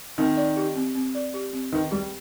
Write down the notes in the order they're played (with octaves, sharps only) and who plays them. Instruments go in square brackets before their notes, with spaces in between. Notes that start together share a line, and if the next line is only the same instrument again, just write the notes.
[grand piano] D#3 [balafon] C4
[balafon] D5
G4
C4
C4
D5
G4
C4
[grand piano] D#3 [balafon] B4
[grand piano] G3 [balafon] G4